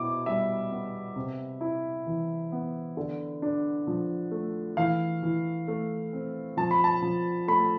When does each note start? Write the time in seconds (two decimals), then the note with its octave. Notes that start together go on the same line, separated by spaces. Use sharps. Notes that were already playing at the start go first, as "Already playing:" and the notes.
Already playing: B2 E4 D6
0.26 G3 E5
0.71 B3
1.16 C3
1.61 E4
2.07 E3
2.52 B3
2.97 D3
3.42 D4
3.87 F3
4.31 A3
4.77 E3 F5
5.23 E3
5.68 A3
6.13 C4
6.57 F3 A5
6.71 B5
6.84 A5
7.02 F3
7.48 A3 B5